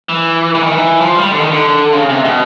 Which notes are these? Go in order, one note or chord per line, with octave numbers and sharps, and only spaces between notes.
E3
E3
D#3
E3
F3
G3
D3
D#3
D3
C#3
C3
B2